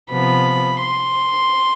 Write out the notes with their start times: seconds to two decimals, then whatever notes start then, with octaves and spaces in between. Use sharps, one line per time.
0.10 C3 F3 B3 B5
0.80 C6